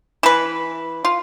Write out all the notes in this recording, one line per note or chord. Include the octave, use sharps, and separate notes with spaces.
E3 B4
F4